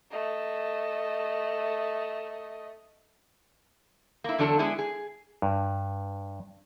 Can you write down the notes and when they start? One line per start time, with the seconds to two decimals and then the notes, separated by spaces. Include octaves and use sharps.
0.11 A3 D#5
4.24 A#3 E4
4.38 E2 D3 F#3 D4 A4
4.59 G#3 B3 D4 E4 G#4
4.79 G#4
5.42 G2